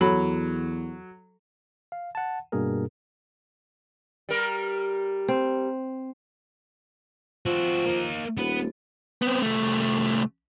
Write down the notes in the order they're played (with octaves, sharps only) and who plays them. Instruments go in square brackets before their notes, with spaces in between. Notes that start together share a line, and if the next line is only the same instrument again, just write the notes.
[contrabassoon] E2 [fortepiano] F#3 [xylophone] A4 B5
[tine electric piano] F5
F#5 A5
G2 B2 A#3 G#4 A#4
[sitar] G3 A#4
[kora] C4
[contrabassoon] F3 [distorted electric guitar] C4 F#4
[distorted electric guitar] A#3 D#4
[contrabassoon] D#1 [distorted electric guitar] B3
[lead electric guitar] B3 C4
C2 A3